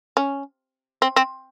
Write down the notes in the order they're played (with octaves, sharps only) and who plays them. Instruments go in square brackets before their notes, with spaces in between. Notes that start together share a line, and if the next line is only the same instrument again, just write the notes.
[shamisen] C#4
C4
C4